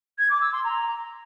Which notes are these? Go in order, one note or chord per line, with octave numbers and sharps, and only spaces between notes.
G#6
D6
E6
C6
A#5